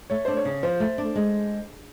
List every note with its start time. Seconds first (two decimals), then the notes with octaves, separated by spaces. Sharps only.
0.10 A3 C#5
0.25 D4 C5
0.37 C#5
0.45 C#3
0.63 F3 C5
0.80 A3
0.98 D4
1.16 G#3